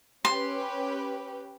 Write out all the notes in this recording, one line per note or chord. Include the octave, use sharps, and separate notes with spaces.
C#4 G4 B4 C6